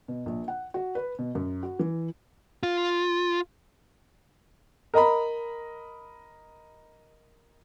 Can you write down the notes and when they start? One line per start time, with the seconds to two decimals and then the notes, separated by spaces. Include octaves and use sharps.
0.08 B2
0.26 A#1
0.48 F#5
0.74 F#4
0.95 B4
1.19 B2
1.35 F#2
1.63 F#4
1.79 E3
2.63 F4
4.94 A#4 D#5 A#5 B5